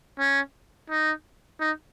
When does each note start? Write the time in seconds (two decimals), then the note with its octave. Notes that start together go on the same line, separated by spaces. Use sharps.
0.19 C#4
0.90 D#4
1.60 D#4